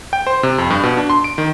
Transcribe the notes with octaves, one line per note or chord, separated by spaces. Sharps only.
G5
C5
C3
F2
G2
B2
D4
C6
D7
D#3